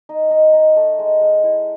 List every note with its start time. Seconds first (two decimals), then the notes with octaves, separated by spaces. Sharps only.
0.09 D#4
0.31 D#4
0.53 D#4
0.76 A3
0.99 G#3
1.21 G#3
1.44 E4